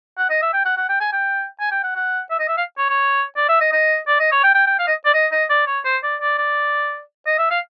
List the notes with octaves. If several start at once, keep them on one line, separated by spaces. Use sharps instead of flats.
F#5
D#5
E5
G5
F#5
F#5
G5
G#5
G5
G#5
G5
F#5
F#5
E5
D#5
E5
F5
C#5
C#5
D5
E5
D#5
D#5
D5
D#5
C#5
G5
G5
G5
F5
D#5
D5
D#5
D#5
D5
C#5
C5
D5
D5
D5
D#5
E5
F5